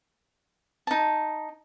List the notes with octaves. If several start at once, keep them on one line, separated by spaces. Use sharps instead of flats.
D#4 A5